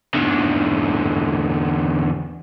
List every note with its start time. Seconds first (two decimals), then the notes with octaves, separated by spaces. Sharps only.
0.15 E2 D3